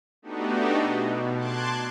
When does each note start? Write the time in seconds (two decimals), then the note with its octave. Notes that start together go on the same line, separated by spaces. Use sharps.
0.22 A3 B3 D4 D#4 F#4 G4
0.80 B2
1.36 A5 C6 D6 F#6 G#6